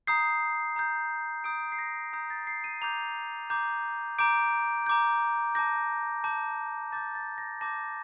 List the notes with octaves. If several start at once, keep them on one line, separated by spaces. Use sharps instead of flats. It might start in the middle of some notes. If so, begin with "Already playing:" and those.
A#5 D#6 G6 C7
A#5 D#6 G6
A#5 D#6 G6 D7
C7
A#6
A#5 D#6 G6
A6
C7
D#7
A#5 D6 G6 F7
A#5 D6 G6
A#5 D6 G6 D7
A#5 D6 G6
A5 D6 G6 A#6
A5 D6 G6
A5 D6 G6 A6
A6
A#6
A5 D6 G6 A#6